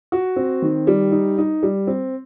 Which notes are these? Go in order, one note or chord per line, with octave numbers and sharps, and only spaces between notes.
F#4
C4
D#3
G3
D#4
D#4
G3
C4